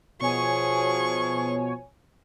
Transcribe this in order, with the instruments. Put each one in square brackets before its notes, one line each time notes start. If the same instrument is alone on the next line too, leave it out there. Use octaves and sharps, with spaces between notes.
[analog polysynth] B2 C#5 G#5 [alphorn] F3 [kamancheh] G#4 C#6